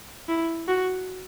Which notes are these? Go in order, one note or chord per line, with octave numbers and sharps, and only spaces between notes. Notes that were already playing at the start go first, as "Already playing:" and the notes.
E4
F#4